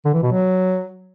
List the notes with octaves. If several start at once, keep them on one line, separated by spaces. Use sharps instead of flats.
D3
E3
B2
F#3